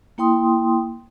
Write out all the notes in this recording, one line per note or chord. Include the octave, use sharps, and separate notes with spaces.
A#3 E4 G5 C6 D#6